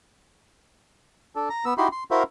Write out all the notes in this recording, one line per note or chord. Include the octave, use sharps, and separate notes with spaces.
D4 A4
A#5
B3 E6
D#4 E4 F#4 G4 B5 C6
C6
E4 F#4 A#4 C5 E5 F5